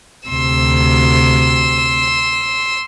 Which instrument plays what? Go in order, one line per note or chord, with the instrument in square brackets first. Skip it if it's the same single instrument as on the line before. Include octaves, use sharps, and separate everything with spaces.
[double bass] D2 C3 [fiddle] C6 E6